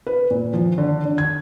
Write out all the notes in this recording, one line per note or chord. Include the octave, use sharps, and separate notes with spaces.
B4
A#2
F3
D3
D3
G#6